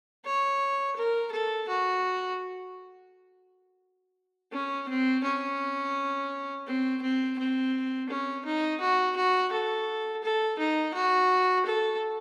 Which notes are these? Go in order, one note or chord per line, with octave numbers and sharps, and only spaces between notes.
C#5
A#4
A4
F#4
C#4
C4
C#4
C4
C4
C4
C#4
D#4
F#4
F#4
A4
A4
D#4
F#4
A4